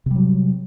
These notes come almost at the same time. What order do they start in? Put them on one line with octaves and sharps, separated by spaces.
C3 G3 F#3